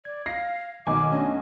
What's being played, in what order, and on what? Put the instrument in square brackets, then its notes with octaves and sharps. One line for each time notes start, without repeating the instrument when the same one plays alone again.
[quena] D5 [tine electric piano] G#6
[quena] F5 [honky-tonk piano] A#6 C7
[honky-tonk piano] B1 G#5 [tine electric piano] D#3 [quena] D6
[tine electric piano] A3 C#4 D4 [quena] D#5